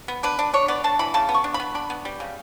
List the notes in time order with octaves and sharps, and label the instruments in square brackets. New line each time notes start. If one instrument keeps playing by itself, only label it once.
[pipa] B3
D4 B4
D4
D4 C#5
B3 D5
D4 A5
E3 B5
C#3 A5
B3
C#6
D4
B5
B3
D4 B5
B3
G3
C#3